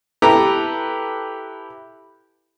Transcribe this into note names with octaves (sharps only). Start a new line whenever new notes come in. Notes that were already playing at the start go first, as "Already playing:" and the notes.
E4 G4 A4 B4 A#5